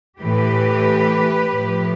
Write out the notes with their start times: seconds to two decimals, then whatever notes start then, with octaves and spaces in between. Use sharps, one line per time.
0.20 A2 E3 G4 B4
1.52 A2 F3